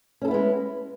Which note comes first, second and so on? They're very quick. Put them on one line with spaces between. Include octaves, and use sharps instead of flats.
C#4 A4 E4 B3 G#3